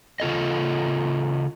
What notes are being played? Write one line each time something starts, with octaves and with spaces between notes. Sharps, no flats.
C#3 F4 A4 D#5